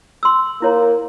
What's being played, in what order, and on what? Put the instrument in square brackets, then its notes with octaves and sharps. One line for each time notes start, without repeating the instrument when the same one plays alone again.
[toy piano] C6 E6
[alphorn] A#3 [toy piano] E4 C#5 A#5